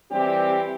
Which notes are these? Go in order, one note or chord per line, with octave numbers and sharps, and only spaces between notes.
E3 G3 C4 G4